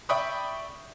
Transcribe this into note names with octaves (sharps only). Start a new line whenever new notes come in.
D5 E5 G5 B5 C#6 D#6